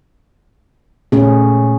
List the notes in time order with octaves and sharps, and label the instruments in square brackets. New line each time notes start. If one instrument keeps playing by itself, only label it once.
[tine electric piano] A#2 [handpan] A3 C#4 G#4